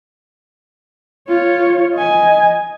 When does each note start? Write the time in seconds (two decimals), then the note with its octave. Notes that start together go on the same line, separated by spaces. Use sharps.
1.29 F4 C#5
1.94 D#5 G#5